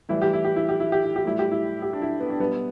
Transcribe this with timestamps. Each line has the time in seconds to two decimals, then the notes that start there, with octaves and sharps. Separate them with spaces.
0.09 A2 E3 G3 E4
0.22 G4
0.33 E4
0.45 G4
0.56 E4
0.69 G4
0.80 E4
0.92 G4
1.04 E4
1.16 G4
1.25 A2 G3 E4
1.39 G4
1.51 E4
1.82 G4
1.93 D4
2.02 E4
2.20 B3
2.30 D4
2.40 B2 G3 B3